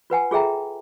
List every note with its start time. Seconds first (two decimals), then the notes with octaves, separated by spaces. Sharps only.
0.10 F4 B4 F#5 G#5
0.31 F4 G#4 A4 E5 G5 A#5